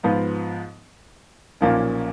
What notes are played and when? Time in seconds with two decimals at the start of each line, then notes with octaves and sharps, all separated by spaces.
0.03 G#2 F3 B3 F4
1.61 B1 A#2 F3 A#3 C#4